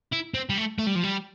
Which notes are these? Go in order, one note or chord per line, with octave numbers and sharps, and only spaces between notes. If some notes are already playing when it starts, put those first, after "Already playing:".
E4
C4
G3
A3
A3
G3
F3
G3